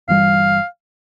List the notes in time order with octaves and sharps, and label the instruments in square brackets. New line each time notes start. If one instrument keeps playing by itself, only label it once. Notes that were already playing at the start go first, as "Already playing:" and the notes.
[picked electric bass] G1 G2 E3 G3 [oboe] F5